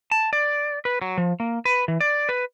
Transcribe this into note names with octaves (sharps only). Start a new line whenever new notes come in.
A5
D5
B4
F#3
F3
A#3
B4
E3
D5
B4